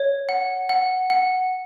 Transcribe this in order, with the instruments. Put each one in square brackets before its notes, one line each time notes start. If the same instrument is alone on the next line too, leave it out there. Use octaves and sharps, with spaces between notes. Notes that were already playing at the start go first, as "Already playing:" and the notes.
Already playing: [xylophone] C#5
F#5
F#5
F#5